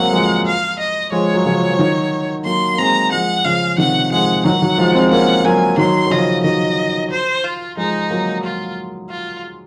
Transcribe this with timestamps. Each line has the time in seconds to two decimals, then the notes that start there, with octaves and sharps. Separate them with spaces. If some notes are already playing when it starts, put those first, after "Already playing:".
Already playing: F#3 G#3 A#3 C4 F#5
0.13 F3 G#3
0.46 F5
0.79 D#5
1.12 F3 G#3 C#5
1.34 F#3
1.46 C#3 F3
1.70 F3
1.79 D#3 F#3
2.45 F#3 A#3 C6
2.74 A#3
2.78 G#3 C4 A#5
3.11 F3 G#3 F#5
3.45 C#3 F3 F5
3.78 C3 D#3 F#5
4.11 F3 G#3 F#5
4.44 D#3 F#3 F#5
4.62 D#3 F#3
4.78 F3 G#3
4.95 G#3 C4
5.11 A#3 C#4 F#5
5.44 F#3 A#3 G#5
5.77 D#3 F#3 C6
6.07 F#3
6.11 C#3 F3 D#5
6.44 D#3 F#3 D#5
7.11 C5
7.44 F4
7.77 F3 G#3 D#4
8.10 F#3 A#3
8.44 F4
9.09 F4